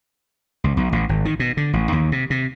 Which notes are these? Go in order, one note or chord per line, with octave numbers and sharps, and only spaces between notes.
C#2
B1
A1
G#1
D#3
B2
D3
A1
D#2
C3
C3